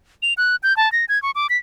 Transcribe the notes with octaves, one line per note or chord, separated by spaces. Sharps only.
F7
F#6
G6
A5
A#6
G#6
C#6
D6
B6